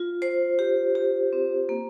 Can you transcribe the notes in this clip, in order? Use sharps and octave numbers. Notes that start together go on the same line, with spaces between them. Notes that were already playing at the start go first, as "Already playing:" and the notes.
Already playing: F4
C5
G4
G4
C4
A#3